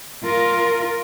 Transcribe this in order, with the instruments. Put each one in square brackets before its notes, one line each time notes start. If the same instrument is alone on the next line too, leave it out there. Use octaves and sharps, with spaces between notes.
[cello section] F4 A#4